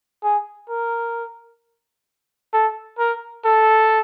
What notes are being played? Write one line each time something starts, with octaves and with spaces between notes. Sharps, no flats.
G#4
A#4
A4
A#4
A4